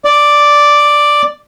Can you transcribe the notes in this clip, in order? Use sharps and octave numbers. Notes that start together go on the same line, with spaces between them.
D5